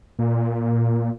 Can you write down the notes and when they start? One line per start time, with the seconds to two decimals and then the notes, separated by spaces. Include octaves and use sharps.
0.19 A#2